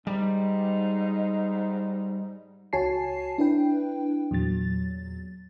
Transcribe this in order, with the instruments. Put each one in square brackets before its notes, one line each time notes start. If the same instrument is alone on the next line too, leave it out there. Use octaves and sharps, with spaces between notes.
[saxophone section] G#2 D#4 [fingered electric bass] G3
[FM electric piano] C#2 F#4 C#5 G#5 A5 C7
D4 E4 B4 G5
E2 A#2 F#3 A6